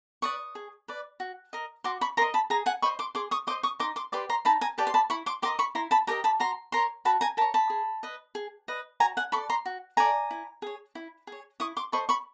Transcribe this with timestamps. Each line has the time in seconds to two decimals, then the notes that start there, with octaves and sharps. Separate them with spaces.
0.22 B4 D5 C#6 D#6
0.55 G#4
0.88 B4 D5
1.20 F#4
1.53 A#4 D#5
1.84 F#4 C6 D6
2.01 B5 C#6
2.17 A#4 A#5 C6
2.22 D#5
2.34 A5 B5
2.50 G#4 G#5 A#5
2.66 F#5 G#5
2.82 C5 D#5 B5 C#6
2.99 C6 D6
3.15 G#4 C6 D6
3.31 C#6 D#6
3.47 D#5 C6 D6
3.50 C5
3.63 C#6 D#6
3.80 D#4 C6 D6
3.96 C6 D6
4.12 G4 B4 D5 C6 D6
4.29 A#5 C6
4.45 D#4 A5 B5
4.61 G#5 A#5
4.78 G4 B4 D5 G5 A5
4.87 C6
4.94 A5 B5
5.10 E4 B5 C#6
5.26 C6 D6
5.42 G4 A#4 D#5 C6 D6
5.59 B5 C#6
5.75 E4 A#5 C6
5.91 A5 B5
6.07 G4 A#4 D#5 G#5 A#5
6.24 A5 B5
6.40 F#4 A#5 C6
6.72 A#4 C#5 A#5 C6
7.05 F#4 A5 B5
7.21 G#5 A#5
7.37 A#4 A5 B5
7.41 C#5
7.54 A5 B5
7.70 G#4
8.03 B4 D#5
8.35 G#4
8.68 B4 D#5
9.00 F#4 G#5 A#5
9.17 F#5 G#5
9.32 A4 B5 C#6
9.36 D5
9.49 A#5 C6
9.65 F#4
9.97 A4 D5 G#5 A#5
10.31 E4
10.62 G#4 C#5
10.95 E4
11.27 G#4 C#5
11.60 E4 C#6 D#6
11.77 C6 D6
11.92 A4 C5 D#5 B5 C#6
12.09 B5 C#6